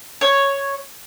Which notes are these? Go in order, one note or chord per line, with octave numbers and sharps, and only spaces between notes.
C#5